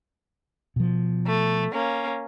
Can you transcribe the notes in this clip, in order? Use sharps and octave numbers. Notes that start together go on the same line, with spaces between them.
B2 F3
A3
A#3 C#4